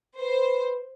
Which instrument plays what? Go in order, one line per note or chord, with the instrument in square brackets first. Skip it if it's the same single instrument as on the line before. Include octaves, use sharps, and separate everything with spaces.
[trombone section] B4 [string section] C5